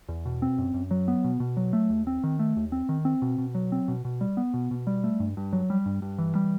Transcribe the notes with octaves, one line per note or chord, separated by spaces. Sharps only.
E2
B2
C4
F#2
F#2
F#3
B3
B2
B2
F#3
A3
D#2
C4
D#3
A3
D#2
C4
D#3
C4
B2
B2
F#3
C4
B2
B2
G3
B3
B2
B2
G3
A3
G2
G2
F#3
G3
G2
G2
E3
G3